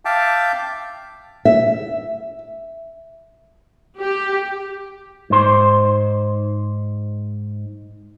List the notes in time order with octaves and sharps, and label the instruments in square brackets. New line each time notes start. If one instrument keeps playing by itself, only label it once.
[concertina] E5 F5 G5 A5 D6
[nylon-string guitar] E5
[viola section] G4
[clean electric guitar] G#2 C5